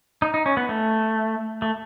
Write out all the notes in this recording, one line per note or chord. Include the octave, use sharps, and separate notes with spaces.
D#4
D#4
C#4
B3
A3
A3